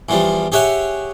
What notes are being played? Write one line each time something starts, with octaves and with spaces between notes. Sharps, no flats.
E2 E3 F3 G3
G4 G#4 C#5 E5 F#5 G#5